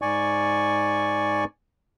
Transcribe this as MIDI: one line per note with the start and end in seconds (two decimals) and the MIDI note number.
0.02 1.44 44
0.02 1.44 74
0.02 1.44 80
0.02 1.44 85